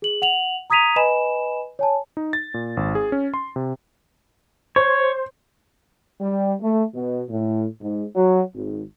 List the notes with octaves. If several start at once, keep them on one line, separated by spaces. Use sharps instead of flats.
G#4 F#7
F#5 F7 F#7
A#5 D#6 G#6 B6 D#7 F7
B4 D#5 G#5 B5 E7
C#5 G#5 A5
D#4
A6
A#2
G#1
G#4
C#4
C6
C3
C5 C#5
G3
A3
B2
A2
G#2
F#3
G#1